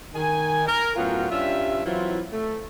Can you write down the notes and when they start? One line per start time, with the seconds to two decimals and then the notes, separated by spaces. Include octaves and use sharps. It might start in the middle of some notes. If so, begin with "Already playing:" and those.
0.14 D#3 G#5
0.67 A#4
0.96 F#2 A2 B3 F4 F#4 G5
1.30 G2 G3 C#4 F4 E5
1.84 E3 F#3 C4 E4 F4
2.31 A3